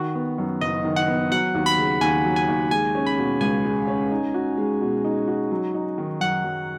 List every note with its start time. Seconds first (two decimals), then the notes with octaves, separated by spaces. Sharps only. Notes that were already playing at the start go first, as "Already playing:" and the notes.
Already playing: D#3 F#4
0.15 B3
0.38 F#2
0.61 F#1 D#5
0.85 D#3
0.96 F#5
1.07 B3
1.32 F#3 F#5
1.55 D#2
1.66 B5
1.77 C#3
2.01 D#2 G#5
2.24 F#3
2.36 G#5
2.48 D#2
2.71 G#3 G#5
2.95 C#4
3.06 B5
3.18 B2
3.41 C#2 G#5
3.65 G#3
3.87 C#4
4.11 D#4
4.34 F#4
4.57 G#3
4.81 B2
5.04 D#4
5.28 F#4
5.51 F#3
5.74 D#4
5.98 D#3
6.20 F#2 F#5
6.44 F#3